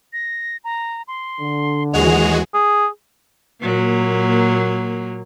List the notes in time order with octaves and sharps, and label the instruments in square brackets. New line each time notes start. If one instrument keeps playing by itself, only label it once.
[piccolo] A#6
A#5
C6
[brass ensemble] D3
[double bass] D#2 E3 [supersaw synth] G#3 F#4 G#4 [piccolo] F7
[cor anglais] G#4
[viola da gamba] A#2 F#3 A#3